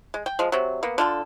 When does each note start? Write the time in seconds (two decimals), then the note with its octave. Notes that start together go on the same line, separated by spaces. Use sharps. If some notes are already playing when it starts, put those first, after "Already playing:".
0.14 G#3
0.26 G5
0.39 F3 G#3
0.52 C3 F#3
0.83 A#3 B3
0.98 D3 F4 A4